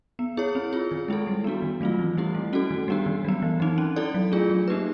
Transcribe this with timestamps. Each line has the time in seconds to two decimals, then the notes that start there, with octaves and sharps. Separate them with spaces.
0.19 B3
0.37 E4 G#4 C#5
0.55 C4
0.73 F4 G#4
0.91 D#3
1.08 G#3 C4 E4 A4
1.27 G3
1.44 B3 D4 F#4
1.62 D#3
1.81 F#3 A3 C4 F4
1.99 E3
2.17 G3 C4 E4 G4
2.35 A3
2.53 C#4 F#4 A4
2.71 D#3
2.88 G3 B3 D4 G4
3.06 D#3
3.25 F#3 B3
3.42 E3
3.60 G3 C4 D#4
3.78 C#4
3.96 E4 A4 D5
4.14 F#3
4.32 A3 D4 F4 G#4
4.50 F#3
4.68 A#3 D#4 G4 B4